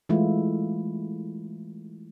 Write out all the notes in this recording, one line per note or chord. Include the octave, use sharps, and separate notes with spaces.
E3 G#3 A3 E4 F4